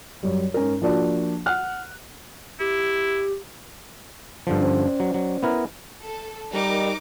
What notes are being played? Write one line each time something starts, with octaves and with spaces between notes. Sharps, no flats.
F#2 G3
G#2 C#4 A#4
F3 A#3 D4 F#4
F#5 F6 F#6
E4 G4
G2 D3 F3
C#4 C5 D5
F#3
F#3
B3 E4 A#4
A4
G3 D#4 A#4 D6